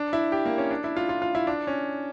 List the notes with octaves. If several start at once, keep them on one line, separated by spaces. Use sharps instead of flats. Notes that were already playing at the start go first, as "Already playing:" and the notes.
Already playing: D4
E4
G4
A#3
C#4
D4
E4
F4
F4
F4
E4
D4
C#4